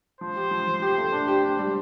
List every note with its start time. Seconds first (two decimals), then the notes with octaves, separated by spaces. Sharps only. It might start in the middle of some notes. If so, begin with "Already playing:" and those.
0.21 F3 C5
0.36 G4
0.51 F3
0.67 F3
0.82 G4
0.97 A3
1.12 D4
1.28 G4
1.44 D4
1.59 G3